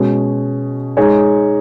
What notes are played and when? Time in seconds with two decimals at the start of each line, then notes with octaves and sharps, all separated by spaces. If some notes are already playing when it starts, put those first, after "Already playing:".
Already playing: B2 G#3 C#4
0.97 G#3 D#4 G#4 C#5